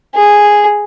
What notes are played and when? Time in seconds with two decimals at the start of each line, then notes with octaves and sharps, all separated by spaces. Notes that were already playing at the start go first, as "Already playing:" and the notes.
0.15 G#4